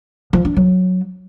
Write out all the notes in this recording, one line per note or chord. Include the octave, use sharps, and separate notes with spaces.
F3
D4
F#3